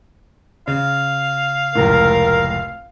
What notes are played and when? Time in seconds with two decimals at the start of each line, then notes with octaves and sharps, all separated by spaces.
0.68 C#3 F5
1.75 F1 C#2 A2 A#4